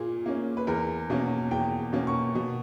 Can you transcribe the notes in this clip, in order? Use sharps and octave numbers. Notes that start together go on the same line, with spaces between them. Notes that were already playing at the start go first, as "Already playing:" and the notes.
Already playing: A#2 A#3 G#4
A#3 C#4
B4
E2 A#4
B2 A#3 C#4
E2 G5
B2 A#3 C#4
C#6
B2